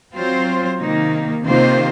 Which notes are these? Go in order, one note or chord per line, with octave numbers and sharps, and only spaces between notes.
F#3 C4 F4 C5
C3 D#3 A#3 D#4
C3 D#3 A#3 F4 C5